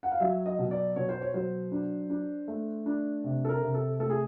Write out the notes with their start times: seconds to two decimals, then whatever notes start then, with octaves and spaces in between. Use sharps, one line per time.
0.03 F#5
0.12 F5
0.20 F#3 E5
0.46 D#5
0.59 B2
0.71 D5
0.96 B2 C#5
1.09 C5
1.21 C#5
1.34 F#3 C5
1.72 D4
2.10 D4
2.48 A3
2.86 D4
3.24 C3
3.45 A4
3.49 A#4
3.62 C3
3.74 A4
3.99 A3 A4
4.10 G#4